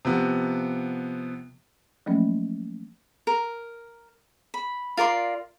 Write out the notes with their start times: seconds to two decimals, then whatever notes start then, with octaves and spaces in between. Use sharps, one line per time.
0.05 C3 F3 B3
2.06 F3 F#3 A3 A#3 C#4
3.27 A#4
4.54 B5
4.97 F4 A#4 D5 C6